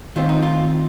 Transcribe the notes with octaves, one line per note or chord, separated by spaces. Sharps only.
D#3 A3 C4 F4
D#4
F4